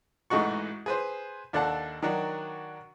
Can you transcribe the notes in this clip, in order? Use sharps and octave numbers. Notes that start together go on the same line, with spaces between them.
A1 G#2 A3 D#4 F#4 C#6
G#4 B4 C5
D#2 D4 A4 F#5 A5
D#3 F#3 D4 F#4